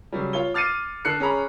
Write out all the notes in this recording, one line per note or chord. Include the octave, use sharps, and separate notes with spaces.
C#3 F#3 G3
F4 C#5 G7
D6 F6 A6 C7 C#7 D#7
D3 F#6 C7 C#7
C#4 G#4 A#5 B5